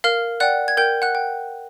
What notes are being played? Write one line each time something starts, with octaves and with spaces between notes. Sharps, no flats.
A#4 F5 F6
D5 F#5 G5 F#6
G#6
A#4 G5 G6
F#5 F#6
G5